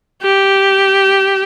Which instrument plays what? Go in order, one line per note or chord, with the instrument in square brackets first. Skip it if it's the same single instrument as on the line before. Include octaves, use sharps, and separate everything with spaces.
[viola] G4